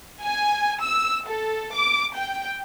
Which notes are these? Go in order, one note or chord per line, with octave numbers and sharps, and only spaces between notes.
G#5
E6
A4
D6
G5